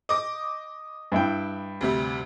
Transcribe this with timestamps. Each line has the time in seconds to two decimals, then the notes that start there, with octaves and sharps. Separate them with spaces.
0.09 D#5 D6 D#6
1.12 G2 E4 G5
1.81 D2 C3 G3